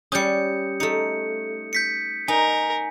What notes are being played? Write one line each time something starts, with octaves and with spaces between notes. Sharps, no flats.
G3 C#4 D#6 G6 C#7
A3 D#4 C#7
G6 B6 C#7
D#4 A#4 G#5